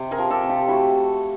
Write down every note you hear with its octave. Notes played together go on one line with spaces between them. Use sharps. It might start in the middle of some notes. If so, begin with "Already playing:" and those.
Already playing: C3
G#4 A#4
F3
G4 A4
C3
F4 G4
A3 E4 F#4